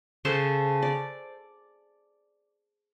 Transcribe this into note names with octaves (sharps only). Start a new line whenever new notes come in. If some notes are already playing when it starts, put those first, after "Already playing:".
C#3 A4 C5 A5
D5